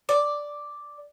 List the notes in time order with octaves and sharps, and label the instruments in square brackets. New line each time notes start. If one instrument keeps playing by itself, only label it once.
[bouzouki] D5